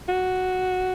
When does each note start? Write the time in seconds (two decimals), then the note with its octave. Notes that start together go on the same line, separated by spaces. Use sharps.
0.08 F#4